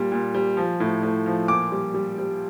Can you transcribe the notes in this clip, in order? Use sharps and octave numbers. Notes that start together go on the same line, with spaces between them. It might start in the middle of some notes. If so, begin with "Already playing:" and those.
Already playing: A#2 G3
A#2
G3
F3
A2
A2
F3
A#2 D6
G3
G3
G3